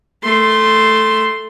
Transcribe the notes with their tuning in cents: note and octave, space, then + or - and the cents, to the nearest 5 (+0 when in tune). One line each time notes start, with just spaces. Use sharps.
A3 +0 C6 +0